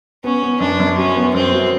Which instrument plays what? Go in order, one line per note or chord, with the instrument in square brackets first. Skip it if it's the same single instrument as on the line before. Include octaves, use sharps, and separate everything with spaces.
[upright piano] B3 [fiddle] C#4
[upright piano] B3
[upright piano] F#2 [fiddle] D4
[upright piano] F#2
[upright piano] F#3 [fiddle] C#4
[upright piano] B3
[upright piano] F#2 [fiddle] C4
[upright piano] F#3